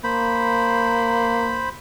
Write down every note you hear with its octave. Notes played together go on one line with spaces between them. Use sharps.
A#3 C5 B5